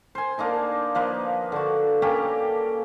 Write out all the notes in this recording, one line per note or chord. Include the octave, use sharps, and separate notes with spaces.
C5 G#5
A#3 D4 D#4 A5
F3 A#3 B4 D#5
D3 F#4
A#3 C#4 G4 A4